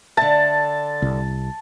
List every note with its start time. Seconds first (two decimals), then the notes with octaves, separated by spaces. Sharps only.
0.17 D3 E5 A5
1.02 C2